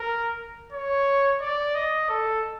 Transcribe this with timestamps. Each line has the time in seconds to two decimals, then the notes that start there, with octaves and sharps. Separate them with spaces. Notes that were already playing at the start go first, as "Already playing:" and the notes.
Already playing: A#4
0.72 C#5
1.41 D5
1.75 D#5
2.09 A4